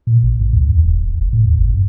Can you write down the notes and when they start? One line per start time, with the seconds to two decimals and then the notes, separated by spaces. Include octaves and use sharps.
0.07 A#2
0.23 A1
0.40 G#2
0.53 D2
0.68 E2
0.85 E1
0.98 D1
1.18 F#1
1.33 A2
1.46 D#2
1.58 G1
1.74 G2